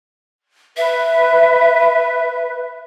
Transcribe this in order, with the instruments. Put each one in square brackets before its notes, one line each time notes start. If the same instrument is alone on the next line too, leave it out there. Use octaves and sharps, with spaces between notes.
[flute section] B4 [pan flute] E5